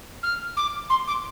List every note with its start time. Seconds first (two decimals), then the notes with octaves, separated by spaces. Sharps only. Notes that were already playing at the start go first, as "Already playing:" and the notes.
0.23 F6
0.57 D6
0.90 C6
1.07 D6